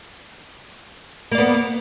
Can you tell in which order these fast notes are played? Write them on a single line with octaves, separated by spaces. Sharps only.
A#3 D5 B3